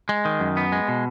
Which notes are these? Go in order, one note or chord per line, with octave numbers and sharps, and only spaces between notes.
G#3
D#3
F#2
B3
G#3
B2